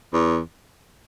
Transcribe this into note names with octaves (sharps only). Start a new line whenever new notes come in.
E2